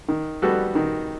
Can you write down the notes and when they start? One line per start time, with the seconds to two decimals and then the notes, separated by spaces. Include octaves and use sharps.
0.08 D#3
0.42 G3 B3 F#4 A4
0.75 D#3